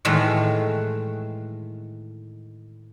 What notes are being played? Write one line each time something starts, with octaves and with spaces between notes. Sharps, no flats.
A2 D#3 E3 G#3 A3